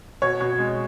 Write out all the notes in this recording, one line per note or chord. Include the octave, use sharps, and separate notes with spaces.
B2 C#5
B2
G#3